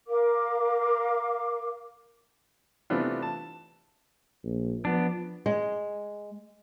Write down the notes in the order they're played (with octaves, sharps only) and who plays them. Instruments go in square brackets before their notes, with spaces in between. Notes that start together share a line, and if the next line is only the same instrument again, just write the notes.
[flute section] A#4 F5 D6
[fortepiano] C3 E3 A3 B3 D4 F4
A5
[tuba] A#1
[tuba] F3 [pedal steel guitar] B3 D4
[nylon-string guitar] G#3